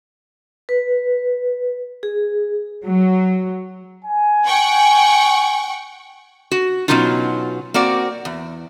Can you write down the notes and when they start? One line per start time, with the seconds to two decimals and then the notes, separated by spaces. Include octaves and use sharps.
0.69 B4
2.03 G#4
2.85 F#3
4.05 G#5
4.46 F#5 G5 C#6
6.51 F#4
6.88 B2 F3 F#3 C#4 D#4 F4
7.74 A#3 C4 F#4 D5
8.25 E2